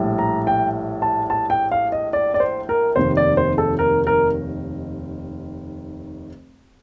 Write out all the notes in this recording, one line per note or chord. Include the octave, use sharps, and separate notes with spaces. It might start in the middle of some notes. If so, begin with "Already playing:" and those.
Already playing: A#1 A2 G3
A#5
G5
A5
A5
G5
F5
D#5
D5
D5
C5
A#4
F1 D#2 D#3 C5
D5
C5
A4
A#4
A#4